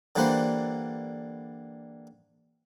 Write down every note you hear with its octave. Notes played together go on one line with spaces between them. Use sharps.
D3 E3 G3 A#3 B4 C5